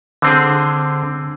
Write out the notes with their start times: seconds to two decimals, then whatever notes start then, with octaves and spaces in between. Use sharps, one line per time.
0.22 D3 C4 G#4